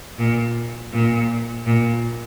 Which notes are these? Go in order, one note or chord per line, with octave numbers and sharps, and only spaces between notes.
A#2
A#2
A#2